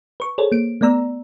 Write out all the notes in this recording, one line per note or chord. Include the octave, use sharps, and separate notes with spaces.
B4 C#6
G#4 A4 C5 C#5
A#3 D7
A3 B3 D5 A#5 E6